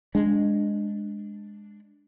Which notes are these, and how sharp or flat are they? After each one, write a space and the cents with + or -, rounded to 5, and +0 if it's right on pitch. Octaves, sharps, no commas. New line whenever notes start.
G#3 -5 D4 +0